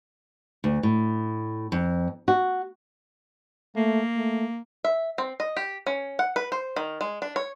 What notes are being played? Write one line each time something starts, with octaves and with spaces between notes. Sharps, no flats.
D2
A2
F2
F#4
A3 A#3
A3
E5
C4
D#5
G4
C#4
F#5
B4
C5
D#3
G#3
D4
C#5